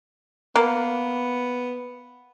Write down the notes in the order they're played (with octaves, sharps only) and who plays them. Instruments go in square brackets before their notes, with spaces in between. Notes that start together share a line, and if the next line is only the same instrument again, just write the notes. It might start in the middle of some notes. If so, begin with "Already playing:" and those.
[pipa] A#3 [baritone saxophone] B3